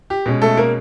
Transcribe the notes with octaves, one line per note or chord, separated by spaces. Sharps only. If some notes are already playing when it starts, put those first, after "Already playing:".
G4
B2 G#3 C#4
A3 A4
A#3 A#4